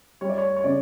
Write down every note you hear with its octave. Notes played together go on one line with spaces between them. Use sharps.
G3 C#5
D5
C#5
C#5
C#3 D5